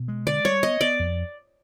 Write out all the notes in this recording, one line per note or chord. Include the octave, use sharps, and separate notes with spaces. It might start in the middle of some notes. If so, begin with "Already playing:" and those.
Already playing: B2
G#3
D3 D5
G3 C#5
B3 D#5
B3 D5
F2